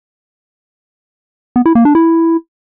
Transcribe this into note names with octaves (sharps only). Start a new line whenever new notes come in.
B3
E4
A#3
D4
E4